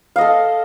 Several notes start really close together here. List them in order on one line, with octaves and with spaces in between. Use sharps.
F5 D#5 A4